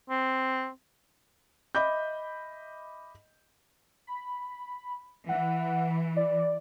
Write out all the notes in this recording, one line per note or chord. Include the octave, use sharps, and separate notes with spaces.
C4
D#5 E5 B5 D6 G6
B5
E3 F#5
D5